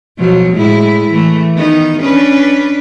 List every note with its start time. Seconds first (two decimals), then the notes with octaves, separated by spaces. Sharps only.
0.19 B2 F3 F#3
0.53 A2 G#3 E4
1.11 E3 A3
1.55 D#3 B3 D#4
2.01 C#4 D4 B4